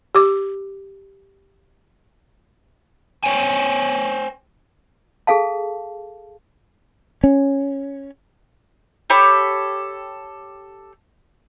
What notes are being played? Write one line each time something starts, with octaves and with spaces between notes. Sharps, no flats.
G4 D6
C5 C#5 G5 G#5
G#4 A4 F5 A5
C#4
G4 A4 C#5 B5